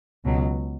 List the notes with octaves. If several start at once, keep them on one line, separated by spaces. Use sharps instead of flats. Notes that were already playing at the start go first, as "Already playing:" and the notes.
C#2 B2 F#3